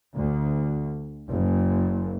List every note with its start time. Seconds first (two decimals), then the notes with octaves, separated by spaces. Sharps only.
0.15 D2
1.29 F#1